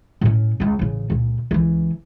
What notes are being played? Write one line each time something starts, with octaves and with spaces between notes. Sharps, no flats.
A2 C#4
C#2 G#3
A1 C#3
C#2 A#2
C#2 E3